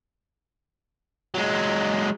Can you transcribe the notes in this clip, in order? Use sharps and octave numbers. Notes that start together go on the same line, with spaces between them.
F#3 G#3